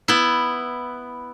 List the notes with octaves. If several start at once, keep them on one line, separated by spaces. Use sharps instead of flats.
B3 E4